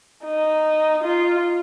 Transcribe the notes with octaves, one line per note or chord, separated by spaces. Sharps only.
D#4
F4